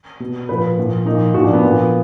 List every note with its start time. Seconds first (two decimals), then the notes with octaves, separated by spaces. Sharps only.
0.20 B2
0.49 A#2 F3 B4
0.77 A#2 F3
1.06 A#2 F3 D#4
1.34 A#2 F3 F#4
1.44 D4
1.53 B3
1.63 A#2 F3